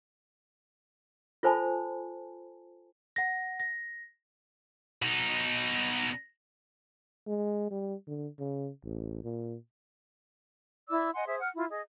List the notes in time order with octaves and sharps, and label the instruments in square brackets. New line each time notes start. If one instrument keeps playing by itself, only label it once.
[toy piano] F4 A4 C5 G#5 A5 B5
[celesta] F#5 A#6
A#6
[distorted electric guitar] B2 D#4
[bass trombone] G#3
G3
D3
C#3
A1
A#2
[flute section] E4 D5 D6 E6
D#5 F#5 G#5 C6
G#4 C5 E5
F#5 F6
E4 F4
G#4 D#5